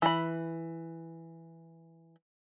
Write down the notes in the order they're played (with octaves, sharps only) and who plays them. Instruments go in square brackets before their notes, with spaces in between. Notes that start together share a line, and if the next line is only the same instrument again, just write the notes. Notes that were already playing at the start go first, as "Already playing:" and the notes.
[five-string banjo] E3 B5